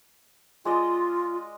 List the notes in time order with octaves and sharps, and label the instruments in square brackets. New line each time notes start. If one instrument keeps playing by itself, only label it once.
[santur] G#3 D5 D#5 [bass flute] F4